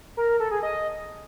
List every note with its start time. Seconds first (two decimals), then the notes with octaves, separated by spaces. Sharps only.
0.17 A#4
0.28 A#4
0.40 A4
0.51 G#4
0.63 D#5